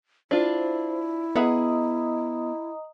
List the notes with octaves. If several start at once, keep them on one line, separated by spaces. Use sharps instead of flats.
D4 E4 F4 C5
B3 G#4 D#5 E5 F#5 A#5 D#6